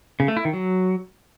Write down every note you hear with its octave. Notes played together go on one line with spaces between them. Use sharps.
C#3
A3
E4
D#3
F#3